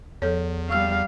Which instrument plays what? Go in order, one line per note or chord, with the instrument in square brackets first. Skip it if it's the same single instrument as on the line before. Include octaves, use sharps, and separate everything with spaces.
[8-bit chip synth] E2 [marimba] F3 A4 C#5
[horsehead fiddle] G3 F5 [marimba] C#6 E6 F6